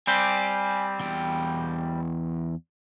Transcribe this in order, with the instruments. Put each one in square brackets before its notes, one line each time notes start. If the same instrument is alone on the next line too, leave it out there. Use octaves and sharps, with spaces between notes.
[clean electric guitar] G3 C4 G4 [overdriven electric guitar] G#5
[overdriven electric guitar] E2 G5